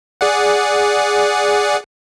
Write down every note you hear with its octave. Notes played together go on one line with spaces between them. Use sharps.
G#4 D5 F#5